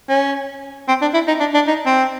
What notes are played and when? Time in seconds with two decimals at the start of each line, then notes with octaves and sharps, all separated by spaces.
0.09 C#4
0.88 C4
1.01 D4
1.14 E4
1.27 D#4
1.40 D4
1.54 D4
1.67 D#4
1.86 C4